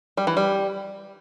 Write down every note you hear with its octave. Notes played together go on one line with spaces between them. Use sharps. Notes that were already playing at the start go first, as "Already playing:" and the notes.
G3
E3
G3